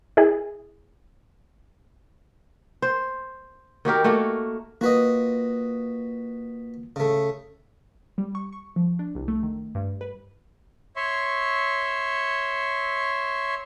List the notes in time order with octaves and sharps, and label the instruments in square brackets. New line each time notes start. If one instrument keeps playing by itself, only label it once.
[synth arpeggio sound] E4 G#4
[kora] C5
D#3 F#4 G4 A#4
A3 A#3 F#4 A#4
[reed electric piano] A#3 F4 [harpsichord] F#4 B4 D#5
[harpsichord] C#3 A3
[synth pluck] G3
C#6
C#6
F3
D4
C2
A3
D#3
G2
B4
[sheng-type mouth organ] C#5 E5 C6 C#6